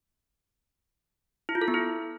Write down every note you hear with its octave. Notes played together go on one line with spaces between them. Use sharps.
E4
F4
A4
B3
E4